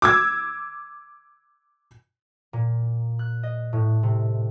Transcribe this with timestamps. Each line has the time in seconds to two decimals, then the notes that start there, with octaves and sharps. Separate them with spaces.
0.02 D6 E6 G#6
2.53 A#2
3.19 F#6
3.43 D#5
3.73 A2
4.03 C3